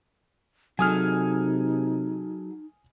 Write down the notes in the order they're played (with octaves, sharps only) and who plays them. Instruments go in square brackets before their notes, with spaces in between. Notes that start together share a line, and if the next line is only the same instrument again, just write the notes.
[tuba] C3 [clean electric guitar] F#3 G#4 A4 [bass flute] D#4 [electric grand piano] G#5 D#6 F6